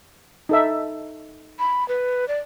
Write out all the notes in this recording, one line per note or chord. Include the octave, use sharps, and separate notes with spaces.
D#4 A4 E5
B5
B4
D5